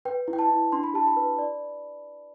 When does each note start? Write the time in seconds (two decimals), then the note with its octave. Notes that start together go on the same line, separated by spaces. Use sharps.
0.05 B4 G5
0.28 E4
0.33 G5
0.39 A5
0.50 E4
0.72 D4 C6
0.83 B5
0.94 G4 A5
1.07 B5
1.16 B4
1.38 D5